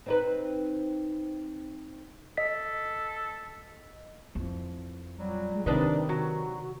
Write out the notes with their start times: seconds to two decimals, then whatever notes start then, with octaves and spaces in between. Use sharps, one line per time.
0.06 C4 D#4 B4
2.37 A4 D#5 B6
4.35 F2 E3
5.19 A#2 F#3 G3
5.52 G#3
5.66 C3 D#3 D4 D#4 B4 D#5
6.09 F#3 F#4